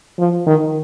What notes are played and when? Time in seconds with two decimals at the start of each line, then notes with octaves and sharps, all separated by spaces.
0.19 F3
0.46 D#3